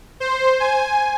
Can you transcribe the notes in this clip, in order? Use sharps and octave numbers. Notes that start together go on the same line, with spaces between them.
C5
G#5